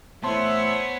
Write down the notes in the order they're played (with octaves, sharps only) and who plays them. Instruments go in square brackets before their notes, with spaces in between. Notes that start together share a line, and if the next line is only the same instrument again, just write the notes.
[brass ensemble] A2 E3 E5 [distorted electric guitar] B3 [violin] C5 C#5 [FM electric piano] A5 C6